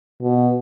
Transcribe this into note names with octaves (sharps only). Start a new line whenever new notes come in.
B2